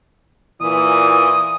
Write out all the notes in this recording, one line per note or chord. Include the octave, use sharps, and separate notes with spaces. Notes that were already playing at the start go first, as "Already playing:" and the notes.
A#2 E3 D#6